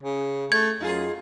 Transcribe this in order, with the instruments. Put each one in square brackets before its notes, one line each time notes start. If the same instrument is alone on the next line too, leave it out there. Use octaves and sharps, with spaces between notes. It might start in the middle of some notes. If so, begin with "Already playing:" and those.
[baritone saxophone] C#3
[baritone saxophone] A3 [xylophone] G#6
[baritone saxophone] F#2 [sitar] D#4 F4 G#4